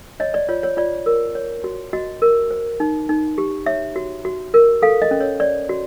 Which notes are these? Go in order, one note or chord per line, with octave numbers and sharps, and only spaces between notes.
C#5 D#5
D5
F4 C#5
C#5
F4 D5
A#4
C#5
F#4
F#4 D#5
A#4
C5
D#4
D#4
G4
C#5 E5
F#4
F#4
A#4
A4 F5
D#5
C#4
C#5
C#5 D5
F#4